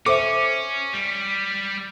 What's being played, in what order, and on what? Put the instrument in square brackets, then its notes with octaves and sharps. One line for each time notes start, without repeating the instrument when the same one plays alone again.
[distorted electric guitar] C#4 [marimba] A4 C5 E5 [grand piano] D6
[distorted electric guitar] G3